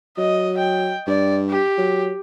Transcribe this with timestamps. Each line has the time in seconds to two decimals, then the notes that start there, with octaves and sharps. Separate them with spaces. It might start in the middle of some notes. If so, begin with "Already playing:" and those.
0.18 F#3 D#5
0.58 G5
1.07 G2 D5
1.49 G4
1.78 F#3